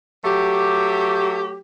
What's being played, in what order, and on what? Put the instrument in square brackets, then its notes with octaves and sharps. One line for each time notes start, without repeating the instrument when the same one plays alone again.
[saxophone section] F#3 A3 G4